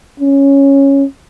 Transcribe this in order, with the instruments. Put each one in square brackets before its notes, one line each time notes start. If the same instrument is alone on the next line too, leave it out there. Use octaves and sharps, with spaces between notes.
[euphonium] C#4